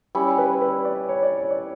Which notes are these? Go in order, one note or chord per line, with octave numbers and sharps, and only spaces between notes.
G3 C#4 E4
B4
B4
D5
C#5
D5
C#5
D5